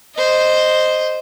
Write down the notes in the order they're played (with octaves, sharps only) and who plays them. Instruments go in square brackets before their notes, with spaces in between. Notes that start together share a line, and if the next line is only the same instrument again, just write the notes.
[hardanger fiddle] C5 D#5